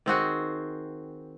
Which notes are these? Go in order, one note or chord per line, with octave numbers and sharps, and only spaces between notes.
D#3 C4 F#4 G#4